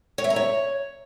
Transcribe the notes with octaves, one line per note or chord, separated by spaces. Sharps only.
C#5
E5
A#5
C#5